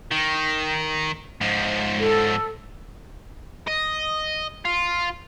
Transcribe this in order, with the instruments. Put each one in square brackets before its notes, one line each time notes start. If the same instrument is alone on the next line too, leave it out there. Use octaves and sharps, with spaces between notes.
[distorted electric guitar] D#3
G#2 F3
[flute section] A4
[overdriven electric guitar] D#5
F4